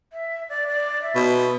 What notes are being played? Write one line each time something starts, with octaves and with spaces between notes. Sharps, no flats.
E5
D5
D5
E5
B2